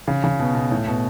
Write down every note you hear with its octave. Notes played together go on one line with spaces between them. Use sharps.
C#3
C#3
B2
B2
A2
B2